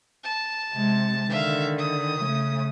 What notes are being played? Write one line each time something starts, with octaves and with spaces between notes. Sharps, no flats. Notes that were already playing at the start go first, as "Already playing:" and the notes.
A5
C3 G#3
D3 D#3 E5 F5
D#6
C#3 A3